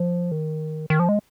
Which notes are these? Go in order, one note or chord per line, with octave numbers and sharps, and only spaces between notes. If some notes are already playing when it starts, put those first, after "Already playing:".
Already playing: F3
D#3
D#3
F3
G#3